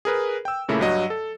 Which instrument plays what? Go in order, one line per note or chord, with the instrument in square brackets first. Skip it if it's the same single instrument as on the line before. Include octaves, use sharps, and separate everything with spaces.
[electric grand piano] G#4 A#4 B4
G5 E6
A#2 C#3 A3 A#3 E4
G2 F#3 D#5 F#5
A4